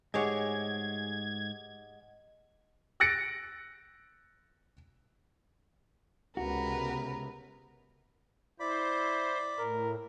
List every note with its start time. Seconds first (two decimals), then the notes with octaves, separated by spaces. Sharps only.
0.14 G#2 A3 G4 G#4 C#5 D#5 F#5 G#6
3.00 E6 F#6 A6 A#6 C#7 D7
6.37 C#2 C3 B3 F#4 A#4 B4
8.60 E4 C5 D5 B5
9.58 A2 A#4